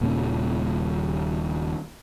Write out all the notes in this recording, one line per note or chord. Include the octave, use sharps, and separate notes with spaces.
D#1 D#2 A#2 C#3